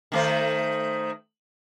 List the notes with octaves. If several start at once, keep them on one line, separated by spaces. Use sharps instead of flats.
D#3 A3 C5